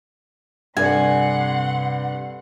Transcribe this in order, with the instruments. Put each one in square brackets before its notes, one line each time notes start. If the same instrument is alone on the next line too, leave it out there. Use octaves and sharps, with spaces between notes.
[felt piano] G2 A4 D5 [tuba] C3 [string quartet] F#5 C6 [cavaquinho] G#5